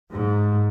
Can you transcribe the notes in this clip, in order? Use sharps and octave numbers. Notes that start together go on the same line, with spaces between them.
G#2